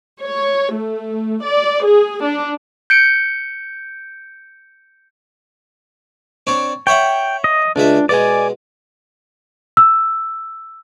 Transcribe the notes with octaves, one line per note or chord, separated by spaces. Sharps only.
C#5
A3
D5
G#4
D4
G6 C#7 D7
C4 D4 C#5
C#5 E5 F#5 G5
D#5
C#2 G#3 D4 E5
B2 G#3 D5 G#5
E6